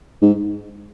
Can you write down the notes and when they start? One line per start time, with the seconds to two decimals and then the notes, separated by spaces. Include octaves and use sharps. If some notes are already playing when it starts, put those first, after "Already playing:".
0.22 G#2